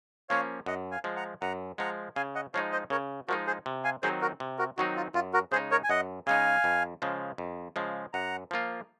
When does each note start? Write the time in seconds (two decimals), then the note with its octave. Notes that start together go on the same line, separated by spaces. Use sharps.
0.30 F3 A#3 C#4 C#5 F5
0.66 F#2 D#5 F#5
0.91 F5 G#5
1.04 F3 G#3
1.16 F#5 A#5
1.41 F#2 F#5 A#5
1.78 F3 G#3 F#5 A#5
2.16 C#3 F5 G#5
2.35 D#5 F#5
2.54 F3 G#3 D#4 C#5 F5
2.72 C5 D#5
2.90 C#3 A#4 C#5
3.28 F3 G#3 D#4 F#4 A#4
3.47 G#4 C5
3.66 C3
3.84 F5 G#5
4.03 D#3 F#3 C4 D#4 G#4 C5
4.21 F#4 A#4
4.40 C3
4.58 F#4 A#4
4.77 D#3 F#3 C4 D#4 F#4
4.96 F4
5.14 F#2 F4
5.34 F#4 A#4
5.52 C#3 G#3 D#4 G#4 C5
5.71 A#4 C#5
5.84 G#5
5.89 F#2 D#5 F#5
6.27 C#3 G#3 D#4 F5 G#5
6.64 F2
7.02 C#3 F3 G#3
7.38 F2
7.76 C#3 F3 G#3
8.13 F#2 F#5 A#5
8.51 F3 A#3 F4